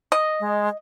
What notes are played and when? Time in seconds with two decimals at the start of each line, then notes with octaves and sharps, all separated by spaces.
0.12 D#5
0.40 G#3